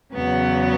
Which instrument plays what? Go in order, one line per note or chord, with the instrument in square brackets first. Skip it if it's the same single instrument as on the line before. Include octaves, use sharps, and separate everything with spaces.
[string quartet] E2 C#3 F#3 B3